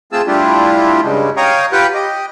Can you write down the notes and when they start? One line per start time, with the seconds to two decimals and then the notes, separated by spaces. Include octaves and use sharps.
0.12 A3 C4 F4 G#4 A5 E6
0.27 G3 A3 D4 E4 F4 G4
1.03 G2 C#3 G3 G#3
1.37 C#5 F5 G5 A#5 C#6 D#6
1.72 F4 G4 B4 F#5 G5
1.94 G4 D#5